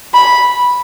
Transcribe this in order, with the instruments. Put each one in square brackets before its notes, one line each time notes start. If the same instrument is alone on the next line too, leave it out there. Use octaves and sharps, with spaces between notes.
[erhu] B5